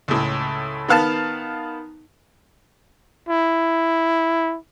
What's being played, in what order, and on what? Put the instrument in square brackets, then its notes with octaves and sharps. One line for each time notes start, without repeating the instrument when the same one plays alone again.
[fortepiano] C#2 A2
D#3 B3 F5 A5
[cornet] E4